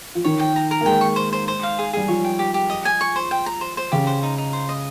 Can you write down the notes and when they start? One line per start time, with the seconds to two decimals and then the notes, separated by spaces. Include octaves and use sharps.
0.15 F3
0.24 D#3 C#5
0.40 G5
0.56 A#5
0.71 A#4
0.81 A#3
0.86 G#3 G5
1.01 C#6
1.16 C5
1.33 C5
1.48 C5
1.63 F5
1.78 G#4
1.93 G3 G#4
2.08 F3 C#5
2.24 G5
2.39 G4
2.54 G4
2.70 D#5
2.85 G#5
3.01 C#6
3.16 C5
3.31 G5
3.46 A#5
3.61 C5
3.77 C5
3.92 C#3 G4
4.07 C5
4.23 D#4
4.38 D#4
4.53 C5
4.69 D#5